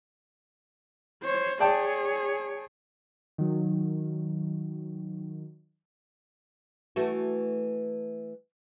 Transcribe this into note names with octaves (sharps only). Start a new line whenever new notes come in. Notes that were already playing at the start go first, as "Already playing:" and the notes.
C5 C#5
G#4 C#5 D5 G5 A5
D#3 F#3
E3 A3 F#4